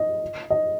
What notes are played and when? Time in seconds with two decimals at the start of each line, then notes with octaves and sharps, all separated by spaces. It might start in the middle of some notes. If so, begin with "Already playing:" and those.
Already playing: D#5
0.50 D#5